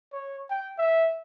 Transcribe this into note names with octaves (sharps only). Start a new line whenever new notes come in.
C#5
G5
E5